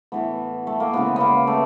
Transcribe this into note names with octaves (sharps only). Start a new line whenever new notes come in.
A2 E3 A3 B3
A3
A#3
C#3 E3 G#3 B3
A#3 B3
A3